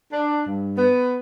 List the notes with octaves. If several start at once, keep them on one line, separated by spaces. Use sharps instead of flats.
D4
G2
B3